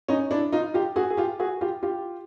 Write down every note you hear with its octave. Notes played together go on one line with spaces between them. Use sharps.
C#4 D#4
D4 E4
D#4 F4
F4 G4
F#4 G#4
G#4
F4 G4
F#4 G#4
F4 G4
F4 G4